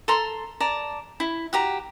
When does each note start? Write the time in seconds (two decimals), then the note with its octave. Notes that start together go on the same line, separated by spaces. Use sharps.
0.08 A4 A#5 C6
0.60 D5 A5 A#5
1.20 E4
1.53 F#4 G4 A#5